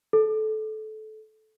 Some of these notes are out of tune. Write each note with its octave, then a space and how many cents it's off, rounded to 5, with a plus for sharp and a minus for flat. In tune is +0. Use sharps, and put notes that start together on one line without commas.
A4 -20